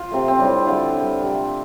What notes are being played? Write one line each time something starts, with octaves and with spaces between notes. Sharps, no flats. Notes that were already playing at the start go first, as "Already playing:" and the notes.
Already playing: F4 C5 F5
C3 A3
C4
A2 G3 D4
D3 F3 A3 F4
D3 G3
C3 A3